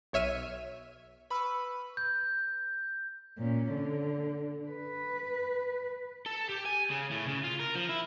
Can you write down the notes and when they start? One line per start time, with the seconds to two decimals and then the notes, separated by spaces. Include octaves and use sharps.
0.13 B1 C#5 E5 F6 D#7
1.30 B4 B5 C#6 E6 F6
1.97 G6
3.38 A#2 C#4
3.72 D3
4.69 B4
6.26 A4
6.49 G4
6.66 G#5
6.90 C#3
7.11 A2
7.28 C#3
7.44 F4
7.60 A#4
7.76 F3
7.89 E4